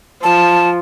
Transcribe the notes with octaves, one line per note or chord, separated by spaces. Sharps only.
F3 A5